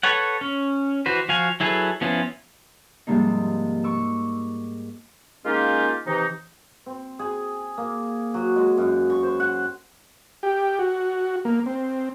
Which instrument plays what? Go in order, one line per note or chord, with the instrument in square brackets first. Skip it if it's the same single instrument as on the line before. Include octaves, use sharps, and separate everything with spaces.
[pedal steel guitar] A4 B4 C#5 F#5
C#4
E3 F#4 B4 C5
F3 F#4 F5 G#5
F#3 E4 G#4 A4 B4
F3 B3 C#4 E4 F4
[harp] G#2 C3 F3 G3 A#3 D#4
C#6 D6 E6
[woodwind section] G#3 A#3 C#4 D#4 F4 G4
C3 E3 D#4
[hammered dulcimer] C4
G#4
A#3
F#3
G#3
F#2
C#6
C5
F#5
[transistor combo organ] G4
F#4
A#3
C4